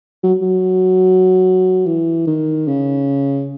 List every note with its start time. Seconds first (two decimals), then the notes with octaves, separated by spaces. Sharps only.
0.23 F#3
0.42 F#3
1.86 E3
2.27 D#3
2.68 C#3